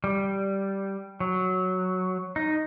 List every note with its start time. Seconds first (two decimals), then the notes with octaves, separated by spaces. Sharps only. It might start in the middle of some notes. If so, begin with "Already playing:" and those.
0.04 G3
1.20 F#3
2.36 D#4